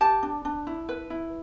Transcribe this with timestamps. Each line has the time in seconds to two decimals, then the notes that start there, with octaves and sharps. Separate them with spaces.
0.01 G4 A5
0.23 D4
0.45 D4
0.67 E4
0.89 B4
1.10 E4